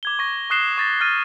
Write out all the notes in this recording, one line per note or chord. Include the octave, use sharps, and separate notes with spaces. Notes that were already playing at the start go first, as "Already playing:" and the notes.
D6 G#6 G7
C#6 A#6
C#6 D#6 F#6 C7 E7 G7
C#6 A6 A#6
F6 F#6 A6 C7 D#7